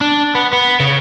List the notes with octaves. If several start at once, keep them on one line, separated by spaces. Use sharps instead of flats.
D4
B3
B3
C#3